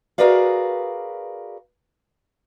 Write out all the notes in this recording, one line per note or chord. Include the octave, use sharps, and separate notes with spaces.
F#4 G#4 A#4 B4 D5 F5